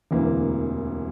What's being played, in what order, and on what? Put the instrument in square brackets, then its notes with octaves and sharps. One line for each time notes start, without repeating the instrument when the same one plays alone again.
[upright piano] E1 D2 C3 E3 A#3